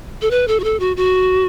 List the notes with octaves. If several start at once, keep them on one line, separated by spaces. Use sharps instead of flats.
A4
B4
A4
F#4
A4
F#4
F#4